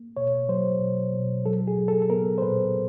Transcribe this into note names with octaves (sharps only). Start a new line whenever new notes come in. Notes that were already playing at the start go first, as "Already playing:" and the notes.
Already playing: A#3
B2 C#5
F#3 C5
B2
B2
F#3 A4
G#4
F#3
A4
A4
B3 A#4
C5
A#2 B4